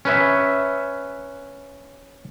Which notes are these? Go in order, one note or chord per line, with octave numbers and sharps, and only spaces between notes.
C#4 B4 E5